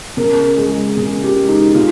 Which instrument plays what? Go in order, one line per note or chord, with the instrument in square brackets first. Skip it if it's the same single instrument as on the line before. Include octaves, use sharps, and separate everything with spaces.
[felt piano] C#3 A#4
G#3 G#4
C#3 G#4
G4
G#3
D#4
C#3 F4